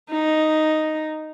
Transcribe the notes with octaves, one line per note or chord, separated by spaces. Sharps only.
D#4